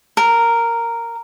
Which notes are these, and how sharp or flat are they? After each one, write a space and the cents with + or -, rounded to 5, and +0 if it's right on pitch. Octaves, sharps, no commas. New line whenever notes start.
A#4 -5